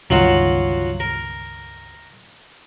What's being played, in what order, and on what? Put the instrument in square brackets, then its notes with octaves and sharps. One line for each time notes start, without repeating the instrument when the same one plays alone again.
[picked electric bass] G1 C#2 D#3 [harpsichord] F#3 F4 F#4
[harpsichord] A#4